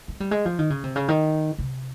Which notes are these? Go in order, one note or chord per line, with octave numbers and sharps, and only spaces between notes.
G#3
G3
G#3
F3
D#3
C#3
C3
C#3
D#3
C3